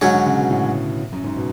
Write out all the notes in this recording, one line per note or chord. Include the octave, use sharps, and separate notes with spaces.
G#2 D3 F#3 C#4 G#4 C#5
D3
C#3
B2
A2
F#2
G#2
B2